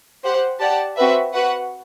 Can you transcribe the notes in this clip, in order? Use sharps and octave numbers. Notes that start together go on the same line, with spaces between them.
G4 C5 F#5
G4 D5 F#5 A5
C4 F#4 B4 E5
F#4 B4 F#5